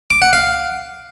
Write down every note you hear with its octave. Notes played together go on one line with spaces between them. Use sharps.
D6
F#5
F5